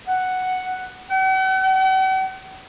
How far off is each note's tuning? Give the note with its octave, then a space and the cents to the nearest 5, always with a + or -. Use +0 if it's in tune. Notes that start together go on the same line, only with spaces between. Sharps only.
F#5 +5
F#5 +45